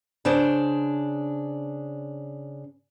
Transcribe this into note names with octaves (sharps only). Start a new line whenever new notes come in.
C#3 D4 C5 D5